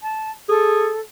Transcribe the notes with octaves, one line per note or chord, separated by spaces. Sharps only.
A5
G#4 A4